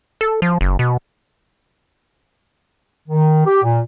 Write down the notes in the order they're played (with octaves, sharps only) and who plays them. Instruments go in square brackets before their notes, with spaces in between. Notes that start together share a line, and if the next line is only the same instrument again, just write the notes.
[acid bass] A4
F3
F#1
B2
[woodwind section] D#3
G4
A#2